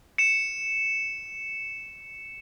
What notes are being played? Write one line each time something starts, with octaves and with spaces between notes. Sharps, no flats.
C#7 E7